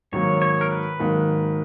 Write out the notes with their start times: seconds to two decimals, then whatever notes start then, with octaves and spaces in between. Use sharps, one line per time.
0.12 G#2 D#3 F#3 A#3 C#5
0.42 C#5
0.61 A#4
0.71 B4
0.99 G#2 D#3 F#3 A#3